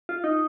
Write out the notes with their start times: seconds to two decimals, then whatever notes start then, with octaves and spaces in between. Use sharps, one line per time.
0.09 F4
0.24 D#4